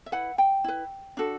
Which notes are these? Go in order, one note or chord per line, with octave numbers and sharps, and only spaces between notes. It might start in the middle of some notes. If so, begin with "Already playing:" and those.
E5
E4 B4 F#5
G5
E4 B4
D4 F#4 A4